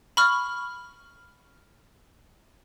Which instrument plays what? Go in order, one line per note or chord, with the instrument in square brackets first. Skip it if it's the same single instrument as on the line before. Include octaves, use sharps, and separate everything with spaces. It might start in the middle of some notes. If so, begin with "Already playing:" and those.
[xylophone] B5 C#6 F6